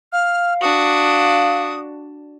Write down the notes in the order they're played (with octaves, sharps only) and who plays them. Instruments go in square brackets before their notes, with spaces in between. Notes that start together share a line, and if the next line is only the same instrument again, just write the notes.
[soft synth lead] F5 [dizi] F6
[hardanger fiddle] D4 F#4 [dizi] D#6